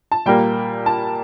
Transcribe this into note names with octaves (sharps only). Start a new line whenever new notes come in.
A5
A#2 G3 A#3 G5
A5